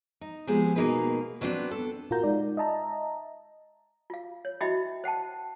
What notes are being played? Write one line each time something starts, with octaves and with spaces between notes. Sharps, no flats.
D#4
F3 G#3 B3 C4 G4 G#4
B2 A#3 D#4 G#4 B4
F#3 G3 B3 C4 D4
A4
A#2 F4 F#4 A#4 A#5 G6
G#3 D#4 D5
D#5 E5 A5 A#5
F4 F5
C#5
E4 F#4 D#5 E5 G5 B5
C5 F#5 G5 A5